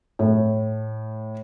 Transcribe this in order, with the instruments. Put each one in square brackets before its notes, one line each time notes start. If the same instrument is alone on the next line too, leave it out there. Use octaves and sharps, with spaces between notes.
[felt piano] A2